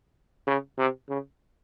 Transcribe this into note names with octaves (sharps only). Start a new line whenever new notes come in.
C#3
C3
C#3